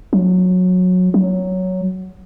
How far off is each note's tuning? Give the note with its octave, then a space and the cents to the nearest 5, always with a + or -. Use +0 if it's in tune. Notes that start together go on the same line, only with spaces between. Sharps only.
F#3 -20
F#3 +5